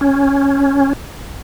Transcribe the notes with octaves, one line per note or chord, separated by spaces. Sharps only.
C#4